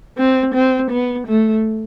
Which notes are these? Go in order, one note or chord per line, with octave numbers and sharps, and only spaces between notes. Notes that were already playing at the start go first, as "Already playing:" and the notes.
C4
C4
B3
A3